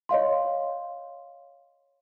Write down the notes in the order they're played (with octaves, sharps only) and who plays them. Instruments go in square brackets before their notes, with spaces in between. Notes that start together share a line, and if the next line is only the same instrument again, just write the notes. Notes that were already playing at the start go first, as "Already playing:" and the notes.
[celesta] C#5 D#5 F5 C6